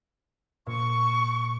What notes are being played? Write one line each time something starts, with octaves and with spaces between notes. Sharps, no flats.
A#2 C#6